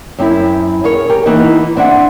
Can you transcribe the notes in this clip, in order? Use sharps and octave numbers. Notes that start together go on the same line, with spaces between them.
F#2 C4 E4
G#4 A#4 C#5
G4 G#4 A#4
E3 A#3 B3 D#4
B3 C4 D4 E5 F#5